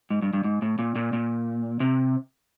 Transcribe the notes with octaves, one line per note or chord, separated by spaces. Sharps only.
G#2
G2
G2
G#2
A2
A#2
A#2
A#2
C3